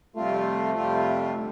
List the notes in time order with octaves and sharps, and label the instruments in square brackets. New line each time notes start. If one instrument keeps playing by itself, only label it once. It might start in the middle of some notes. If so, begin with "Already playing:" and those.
[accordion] F2 C3 G3 C4 F4 [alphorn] A3
[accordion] F2 C3 G3 C4 F4
D3 G3